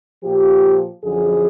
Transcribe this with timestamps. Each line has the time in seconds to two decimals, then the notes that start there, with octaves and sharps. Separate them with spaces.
0.24 A#2 F3 G4
1.02 F#2 D3 F3 G#4